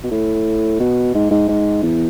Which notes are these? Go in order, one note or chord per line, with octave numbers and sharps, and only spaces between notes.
B2
A2
B2
G#2
G#2
G#2
E2